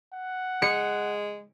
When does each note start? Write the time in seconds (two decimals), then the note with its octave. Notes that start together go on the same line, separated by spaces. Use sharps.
0.13 F#5
0.62 G#3 C#7